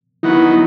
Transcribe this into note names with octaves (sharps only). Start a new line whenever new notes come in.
D#3 F#3 B3 E4